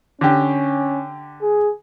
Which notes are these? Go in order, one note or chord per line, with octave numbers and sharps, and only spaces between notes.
D3 C#4 G4
G#4